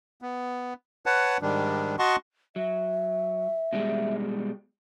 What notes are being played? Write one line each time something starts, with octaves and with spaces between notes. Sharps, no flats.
B3
B4 C#5 F#5 A5
G#2 D#3 G3 D4
F#4 D#5 F#5 A5 C6 C#6
F#3 E5
B2 G3 G#3